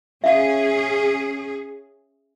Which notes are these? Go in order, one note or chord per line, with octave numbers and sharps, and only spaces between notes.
C#4 G#4 E5 F5